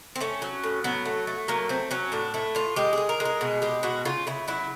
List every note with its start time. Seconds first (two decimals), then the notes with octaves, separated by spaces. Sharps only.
0.16 C4
0.20 A3 C#4
0.42 F#3
0.64 A2
0.84 F#3 B3
1.06 A3
1.27 A3
1.48 F#3 A#3
1.69 A3 C4
1.91 F#3 C#4
2.12 A2 D4
2.34 A3 E4
2.55 A2 F4
2.76 G#3 G4
2.93 G#3 G#4
3.09 A#4
3.20 G#3
3.25 A#4
3.41 B2 G#4
3.62 G#3 G4
3.83 B2 F#4
4.05 C#3 F4
4.27 C#3 E4
4.48 F#3 E4